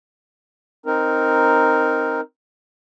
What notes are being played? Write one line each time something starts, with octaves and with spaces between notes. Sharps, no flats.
C4 D#4 A#4